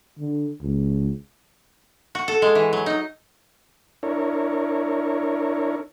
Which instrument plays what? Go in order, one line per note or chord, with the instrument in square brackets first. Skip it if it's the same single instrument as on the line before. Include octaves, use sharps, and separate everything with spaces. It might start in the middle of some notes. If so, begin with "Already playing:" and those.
[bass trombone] D3
C#2
[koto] F#4
A4
G#3
E3
F#3
D#4
[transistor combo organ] D4 E4 A#4 C#5